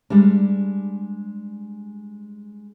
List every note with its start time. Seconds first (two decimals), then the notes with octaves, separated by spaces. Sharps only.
0.10 G3 G#3 D4